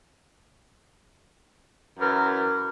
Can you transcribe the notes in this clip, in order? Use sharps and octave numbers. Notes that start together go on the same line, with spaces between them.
F#2 E3 A#4